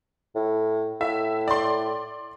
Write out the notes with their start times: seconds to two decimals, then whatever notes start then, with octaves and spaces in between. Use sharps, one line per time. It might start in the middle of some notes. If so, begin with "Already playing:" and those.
0.36 A2
1.01 A2 E5
1.48 D5 C6